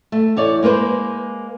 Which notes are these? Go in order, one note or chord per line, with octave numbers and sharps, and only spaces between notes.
A3
E2 C#5 D5
G#3 A#3 B4 C5